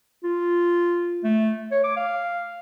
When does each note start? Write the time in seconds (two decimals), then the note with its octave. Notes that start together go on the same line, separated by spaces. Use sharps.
0.24 F4
1.24 A3
1.71 C#5
1.84 D6
1.96 F5